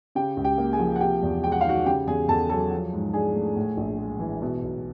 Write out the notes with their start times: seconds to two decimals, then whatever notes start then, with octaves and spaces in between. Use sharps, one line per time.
0.15 C#3 G4 G5
0.37 C#2
0.44 G4 G5
0.58 A#3
0.73 G#4 G#5
0.79 F3
0.96 F#5
1.01 C3 G4 G5
1.22 E2
1.44 G#3 G5
1.52 F#5
1.61 F5
1.64 D#3 F#4 F#5
1.86 C#3 G4 G5
2.07 E2 G#4 G#5
2.28 E2 A4 A5
2.49 F#3 A4 A5
2.71 F3
2.93 G#2
3.13 D4 G#4 G#5
3.36 A3
3.56 A2
3.77 A#1
3.98 G#3
4.20 E3
4.42 B2
4.63 B1